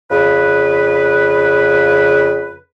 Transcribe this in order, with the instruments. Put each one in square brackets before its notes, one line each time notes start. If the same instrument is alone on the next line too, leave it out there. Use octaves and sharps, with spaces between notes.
[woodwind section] F2 C#3 B4